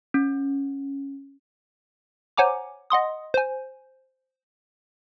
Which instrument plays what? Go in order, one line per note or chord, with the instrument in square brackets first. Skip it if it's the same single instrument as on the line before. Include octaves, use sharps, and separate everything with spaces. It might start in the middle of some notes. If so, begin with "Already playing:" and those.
[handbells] C#4
[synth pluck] C5 C#5 F#5 G#5 A#5 D6
D#5 F#5 C6 D#6
C5 G#5